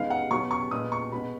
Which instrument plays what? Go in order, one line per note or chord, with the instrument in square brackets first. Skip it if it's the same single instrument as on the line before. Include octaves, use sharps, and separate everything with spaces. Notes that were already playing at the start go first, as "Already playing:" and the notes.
Already playing: [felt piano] D#3 G#3 B3 F5
F#5
B2 F#3 B3 C#6
C#6
A#2 G#3 B3 D#6
C#6
B2 G#3 B3 B5